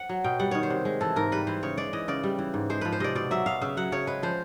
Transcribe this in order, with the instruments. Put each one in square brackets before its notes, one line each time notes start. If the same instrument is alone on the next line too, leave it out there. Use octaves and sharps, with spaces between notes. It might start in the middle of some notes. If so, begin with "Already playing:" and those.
Already playing: [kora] F#5
F#3
B2 G5
G3 F#5
D#3 C#5
C5
C3
G#3
E3 A4
G#2 A#4
G3 B4
E3 C5
C#3 C#5
G#3 D5
E3 D#5
C#3 D5
G3
E3
G#2
G#3 C5
F3 B4
C5
C3 D5 D#5
B2 D5
F#3 E5
B2 F5
C#3 E5
F#3 F#5
C#3 C#5
G#3 B4
F3 C5